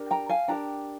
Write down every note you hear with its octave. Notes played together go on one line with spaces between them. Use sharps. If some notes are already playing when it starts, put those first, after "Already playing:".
Already playing: D4 G4 A#4
G5 A#5
F5 G#5
D4 G4 A#4 G5 A#5